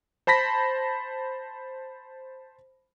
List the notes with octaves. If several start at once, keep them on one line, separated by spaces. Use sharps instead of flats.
C5 A5 B5 A#6 B6